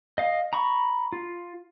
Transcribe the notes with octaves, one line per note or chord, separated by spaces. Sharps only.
D#5 F5
A#5 B5 C#6
F4